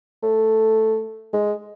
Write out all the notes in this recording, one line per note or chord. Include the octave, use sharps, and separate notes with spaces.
A3
G#3